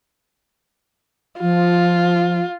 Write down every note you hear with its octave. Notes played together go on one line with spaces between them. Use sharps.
F3 F4